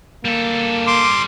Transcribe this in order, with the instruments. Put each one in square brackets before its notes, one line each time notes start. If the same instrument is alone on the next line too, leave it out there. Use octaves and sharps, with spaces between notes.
[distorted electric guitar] G3 A4 [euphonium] A#3
[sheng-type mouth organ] C6 D6